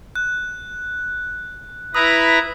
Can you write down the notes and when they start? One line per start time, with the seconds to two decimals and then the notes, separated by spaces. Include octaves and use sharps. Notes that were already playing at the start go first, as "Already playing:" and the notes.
0.15 F#6
1.95 E4 B4 A#5 D#6 B6